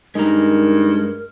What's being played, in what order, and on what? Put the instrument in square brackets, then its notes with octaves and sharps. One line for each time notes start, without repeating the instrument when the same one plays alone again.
[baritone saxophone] G2 [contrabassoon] D#3 [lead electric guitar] G#3 A#5 [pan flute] A#4